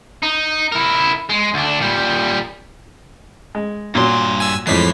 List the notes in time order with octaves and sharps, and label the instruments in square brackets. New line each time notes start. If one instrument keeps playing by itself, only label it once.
[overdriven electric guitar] D#4
E4 A#4
G#3
D2 D4
A#2 G3
[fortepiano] G#3
[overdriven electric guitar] G2 C6 [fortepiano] A#2 F#3
[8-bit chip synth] G#5 E6
[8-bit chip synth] F2 B6 C7 [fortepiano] A2 G#3 [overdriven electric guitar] E3